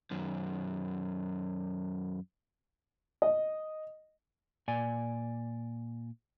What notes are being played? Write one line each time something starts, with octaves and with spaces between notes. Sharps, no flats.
F#2 D#3
D#5
A#2 D5 G#5